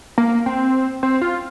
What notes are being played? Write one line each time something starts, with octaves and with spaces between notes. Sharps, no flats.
A#3
C4
C4
F4